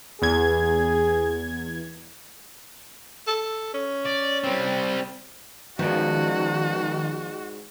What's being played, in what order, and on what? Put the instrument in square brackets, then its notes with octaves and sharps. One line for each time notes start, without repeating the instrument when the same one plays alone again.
[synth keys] E2 G#6 [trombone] G#4
[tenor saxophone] A4
C#4
[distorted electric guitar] D5
G3 C4
[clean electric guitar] G#2 G#3 D5 [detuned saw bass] D#3 [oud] F3 B3 [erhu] F#4